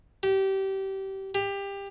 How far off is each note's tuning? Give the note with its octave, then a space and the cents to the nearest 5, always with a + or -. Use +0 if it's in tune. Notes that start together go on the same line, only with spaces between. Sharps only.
G4 -25
G4 +20